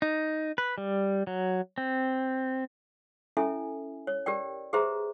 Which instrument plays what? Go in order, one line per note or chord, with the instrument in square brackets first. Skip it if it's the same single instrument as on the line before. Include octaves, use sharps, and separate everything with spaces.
[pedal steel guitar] D#4
B4
G3
F#3
C4
[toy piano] C#4 E4 A4 E5 G#5
C#5
G4 A#4 D5 G5
G4 G#4 B4 C5 E5 A#5